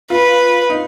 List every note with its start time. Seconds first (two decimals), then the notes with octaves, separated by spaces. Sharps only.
0.10 F4 B4
0.70 D#4